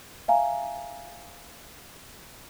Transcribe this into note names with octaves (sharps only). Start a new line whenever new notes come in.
E5 F5 G#5 A#5